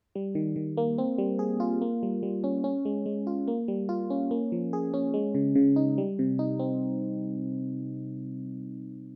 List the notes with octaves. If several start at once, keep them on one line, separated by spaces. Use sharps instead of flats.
G3
D#3
D#3
A#3
C4
G3
G#4
F4
A#3
G3
G3
C#4
C#4
G#3
G#3
F4
A#3
G3
F4
C#4
A#3
F3
G#4
C#4
G#3
C#3
C#3
D#4
G3
C3
D#4
C4